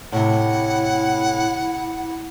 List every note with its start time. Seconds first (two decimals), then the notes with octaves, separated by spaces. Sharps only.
0.12 A2 C3 E4 F#5